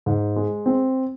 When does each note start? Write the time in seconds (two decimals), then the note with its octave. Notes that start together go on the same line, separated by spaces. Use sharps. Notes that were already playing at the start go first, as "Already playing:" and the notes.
0.06 G#2
0.36 G#3
0.66 C4